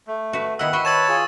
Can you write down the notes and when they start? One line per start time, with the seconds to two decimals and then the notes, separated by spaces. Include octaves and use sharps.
0.07 A3
0.33 F#4 B4
0.59 D#3 B3 E4 D#5 F#5 E6
0.73 F#4 C5 G5 B5 C#6
0.85 B4 C#5 A5 E6 A6 E7
1.09 F4 G#4